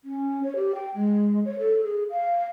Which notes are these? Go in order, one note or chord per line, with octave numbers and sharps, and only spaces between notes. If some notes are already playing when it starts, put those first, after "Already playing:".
C#4
C#5
G4
G5
G#3
C#5
A4
G#4
F5